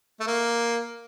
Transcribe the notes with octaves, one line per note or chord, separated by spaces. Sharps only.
A3
A#3